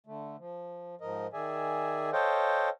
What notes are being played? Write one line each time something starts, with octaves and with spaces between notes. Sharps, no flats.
D3 A3
F3
G#2 F3 A#4 D#5
D#3 G#4 D5 E5 G#5
A4 C5 C#5 D#5 F5 G5